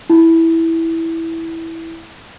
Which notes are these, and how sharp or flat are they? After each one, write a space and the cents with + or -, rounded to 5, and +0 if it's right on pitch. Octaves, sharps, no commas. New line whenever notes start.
E4 -5